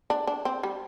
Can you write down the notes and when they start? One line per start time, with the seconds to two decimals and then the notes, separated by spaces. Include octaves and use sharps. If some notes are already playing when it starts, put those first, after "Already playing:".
0.10 D4
0.27 D4
0.45 C4
0.63 G3